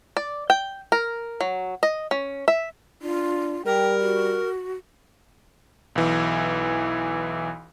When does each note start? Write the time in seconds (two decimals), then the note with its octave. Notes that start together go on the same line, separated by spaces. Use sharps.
0.17 D5
0.50 G5
0.92 A#4
1.41 F#3
1.83 D#5
2.11 C#4
2.48 E5
3.02 D4 F4
3.66 G3 A#4 G5
4.00 F#4
5.95 B1 E3